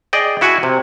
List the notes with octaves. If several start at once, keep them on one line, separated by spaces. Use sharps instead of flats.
G#4 D5 D#5 G5
E4 F#4 F#5 G#5
C3